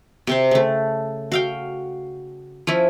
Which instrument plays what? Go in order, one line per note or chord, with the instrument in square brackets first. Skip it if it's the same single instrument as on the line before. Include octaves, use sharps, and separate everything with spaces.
[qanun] C3 C4 C5
C#3 A3
F#4 F5 G5
F3 C#4 E4